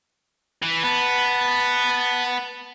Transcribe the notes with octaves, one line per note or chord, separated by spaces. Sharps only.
E3
B3 B4 A5